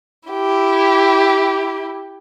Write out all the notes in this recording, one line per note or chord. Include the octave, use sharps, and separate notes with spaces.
E4 G4